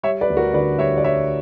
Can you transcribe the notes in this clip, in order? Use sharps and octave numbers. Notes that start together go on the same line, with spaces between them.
G3 C#5 E5
B4 D5
D2
F#4 A#4
D3 B4 D5
G3 C#5 E5
D5
G3 C#5 E5